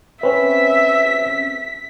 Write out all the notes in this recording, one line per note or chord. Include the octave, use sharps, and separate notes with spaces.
C4 C#4 B4 E5 B6